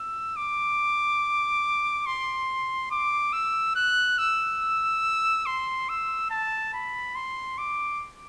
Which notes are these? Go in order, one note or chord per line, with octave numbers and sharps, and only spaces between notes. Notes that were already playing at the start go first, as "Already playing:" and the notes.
Already playing: E6
D6
C6
D6
E6
F#6
E6
C6
E6
A5
B5
C6
D6